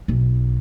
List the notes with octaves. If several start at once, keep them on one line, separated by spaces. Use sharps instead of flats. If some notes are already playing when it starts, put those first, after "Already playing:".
B1